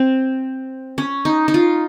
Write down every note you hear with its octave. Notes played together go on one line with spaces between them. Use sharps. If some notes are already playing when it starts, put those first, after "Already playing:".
Already playing: C4
C#4
D#4
D#4
F4